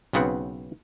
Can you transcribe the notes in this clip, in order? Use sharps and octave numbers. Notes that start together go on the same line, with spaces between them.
B1 C#3 B3 C4 F#5